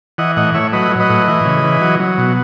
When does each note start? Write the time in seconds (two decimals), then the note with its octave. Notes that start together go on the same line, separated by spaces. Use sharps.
0.18 E3 D#5 F#5
0.36 A2 D#5 F#5
0.54 A2 C#5 E5
0.73 F#3 B4 D#5
0.91 F#3
1.00 B4 D#5
1.09 A2
1.28 E3
1.45 C#3
1.64 E3
1.81 F#3
2.00 F#3
2.18 B2